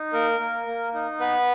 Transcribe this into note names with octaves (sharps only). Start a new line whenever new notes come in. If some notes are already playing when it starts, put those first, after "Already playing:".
Already playing: D#4
A#3 A#4
A#3
A#3
D#4
B3 B4